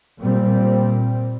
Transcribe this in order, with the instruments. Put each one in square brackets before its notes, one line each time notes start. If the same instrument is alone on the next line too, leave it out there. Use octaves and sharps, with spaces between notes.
[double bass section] A#2 G3 C4